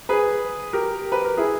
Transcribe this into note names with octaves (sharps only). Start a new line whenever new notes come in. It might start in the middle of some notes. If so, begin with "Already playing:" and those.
G#4 B4
G4 A#4
B4
A#4
E4 G#4